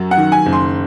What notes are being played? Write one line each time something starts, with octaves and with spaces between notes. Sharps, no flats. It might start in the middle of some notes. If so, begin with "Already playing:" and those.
Already playing: F#2 F#3
F#5
D#3
G#5
F#1
C6